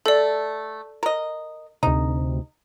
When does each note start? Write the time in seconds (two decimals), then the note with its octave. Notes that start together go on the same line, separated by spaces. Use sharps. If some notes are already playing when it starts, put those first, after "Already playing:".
0.06 A3 A4 D5
1.03 A#4 D#5
1.83 D2 C3 D#4